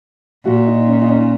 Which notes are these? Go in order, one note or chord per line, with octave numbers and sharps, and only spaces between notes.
A#2 F#4
D#4
C#4
D#4
C#4